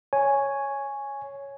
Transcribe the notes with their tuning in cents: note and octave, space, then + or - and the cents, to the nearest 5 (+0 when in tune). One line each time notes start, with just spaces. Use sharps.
C#5 +0 G#5 +0